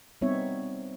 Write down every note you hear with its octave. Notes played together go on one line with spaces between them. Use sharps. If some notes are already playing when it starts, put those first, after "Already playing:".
G3 B3 C4 D#4 C#5 E5